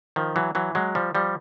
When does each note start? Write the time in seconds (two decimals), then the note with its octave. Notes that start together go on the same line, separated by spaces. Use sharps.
0.16 D#3 F3
0.36 E3 F#3
0.55 E3 F#3
0.75 F#3 G#3
0.95 F3 G3
1.15 F3 G3